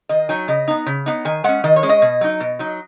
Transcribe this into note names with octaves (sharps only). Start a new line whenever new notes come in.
D#3 D#5
F#3 D#4 G#5
C#3 D#5
B3 D#4
C#3
B3 D#4
D#3 G#5
G#3 C#4 F#5
D#3 D#5
C#5
G#3 C#4
D#5
B2
F#3 D#4
B2
F#3 D#4